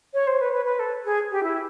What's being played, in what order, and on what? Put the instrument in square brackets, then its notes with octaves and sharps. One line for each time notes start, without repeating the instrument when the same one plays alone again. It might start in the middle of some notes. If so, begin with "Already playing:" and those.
[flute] C#5
C5
B4
B4
B4
A4
G#4
G4
E4